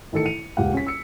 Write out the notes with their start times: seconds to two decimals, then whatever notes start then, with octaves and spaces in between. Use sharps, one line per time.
0.12 A1 D#3 A4 C#7
0.26 C#7 D#7 F7
0.57 D#1 C#2 G4 F5 F#5
0.73 C#4 B6
0.87 E6 C#7